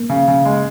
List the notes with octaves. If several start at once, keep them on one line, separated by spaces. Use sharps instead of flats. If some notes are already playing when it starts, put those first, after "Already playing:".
Already playing: A#3
C#3
C#3
G#3